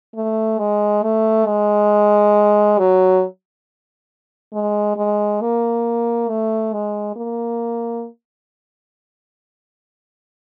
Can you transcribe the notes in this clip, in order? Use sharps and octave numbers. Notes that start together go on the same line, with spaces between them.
A3
G#3
A3
G#3
F#3
G#3
G#3
A#3
A3
G#3
A#3